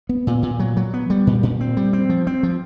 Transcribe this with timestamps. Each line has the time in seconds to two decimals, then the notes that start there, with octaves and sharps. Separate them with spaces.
0.09 B3
0.27 A#2
0.43 A#2
0.59 F#3
0.77 F#3
0.94 B3
1.10 G3
1.27 A#2
1.43 A#2
1.60 C4
1.77 G3
1.93 C4
2.09 F3
2.27 C4
2.43 F3